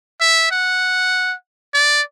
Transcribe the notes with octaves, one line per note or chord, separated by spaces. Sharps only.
E5
F#5
D5